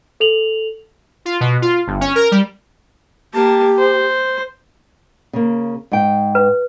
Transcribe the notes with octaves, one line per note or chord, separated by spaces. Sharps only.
A4 F7 F#7
F4
B2
F4
G1
C#4
A#4
G3
A#3 G4 A5
C5
C#3 A#3
G#2 G5
B4